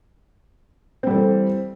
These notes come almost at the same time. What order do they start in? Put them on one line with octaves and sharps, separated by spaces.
C4 G3 A4 E3